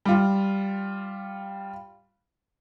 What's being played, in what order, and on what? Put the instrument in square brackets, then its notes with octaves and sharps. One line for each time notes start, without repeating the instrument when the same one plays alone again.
[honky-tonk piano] G3 F4